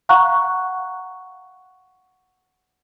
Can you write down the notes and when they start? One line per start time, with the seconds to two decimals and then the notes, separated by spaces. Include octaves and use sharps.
0.09 F5 F#5 A#5 C#6 F#6